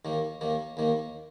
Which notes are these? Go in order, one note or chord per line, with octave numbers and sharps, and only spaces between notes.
D#2 D#3 A#3
D#2 D#3 A#3
D#2 D#3 A#3